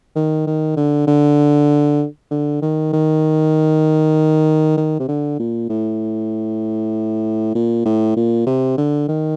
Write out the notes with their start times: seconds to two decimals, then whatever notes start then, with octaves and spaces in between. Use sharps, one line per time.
0.16 D#3
0.47 D#3
0.76 D3
1.07 D3
2.31 D3
2.62 D#3
2.93 D#3
4.77 D#3
4.99 C3
5.08 D3
5.39 A#2
5.69 A2
7.55 A#2
7.86 A2
8.17 A#2
8.46 C3
8.78 D3
9.08 D#3